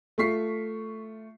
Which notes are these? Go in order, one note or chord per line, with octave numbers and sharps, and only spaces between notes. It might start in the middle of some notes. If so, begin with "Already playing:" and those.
A3 F4 C#6 B6 C7